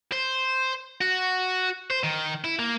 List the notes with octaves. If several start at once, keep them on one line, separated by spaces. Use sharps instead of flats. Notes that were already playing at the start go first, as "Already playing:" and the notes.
C5
F#4
C5
D#3
E4
A#3